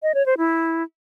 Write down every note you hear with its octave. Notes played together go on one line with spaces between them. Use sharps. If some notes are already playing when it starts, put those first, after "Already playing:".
D#5
C#5
C5
E4